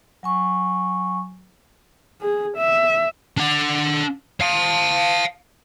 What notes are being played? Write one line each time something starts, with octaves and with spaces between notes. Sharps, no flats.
F#3 G#5 C#6
G#4
E5
D4 F#5
F5 A5